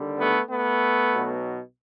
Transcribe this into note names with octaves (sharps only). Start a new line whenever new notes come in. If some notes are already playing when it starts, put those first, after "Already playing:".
Already playing: D#2 D3 G3
A3 B3
A3 B3
B1 B2 F#3